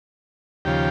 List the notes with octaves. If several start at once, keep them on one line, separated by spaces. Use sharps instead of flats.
D#2 C#3 F3 G4